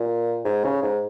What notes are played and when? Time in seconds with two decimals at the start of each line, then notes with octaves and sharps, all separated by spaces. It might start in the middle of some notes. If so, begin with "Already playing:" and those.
Already playing: A#2
0.45 G#2
0.65 C#3
0.83 G#2